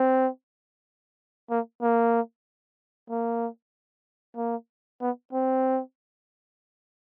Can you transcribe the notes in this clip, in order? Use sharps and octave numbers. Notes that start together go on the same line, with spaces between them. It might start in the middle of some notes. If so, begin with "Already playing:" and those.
Already playing: C4
A#3
A#3
A#3
A#3
B3
C4